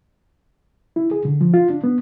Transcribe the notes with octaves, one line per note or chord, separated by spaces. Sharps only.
E4
G#4
D3
F3
F4
D4
B3